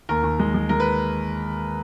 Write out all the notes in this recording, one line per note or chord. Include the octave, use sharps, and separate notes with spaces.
D#2 A#4
D#2
G#3
G#3
G#3 A#4
B4